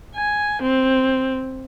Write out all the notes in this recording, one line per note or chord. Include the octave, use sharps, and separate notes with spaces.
G#5
C4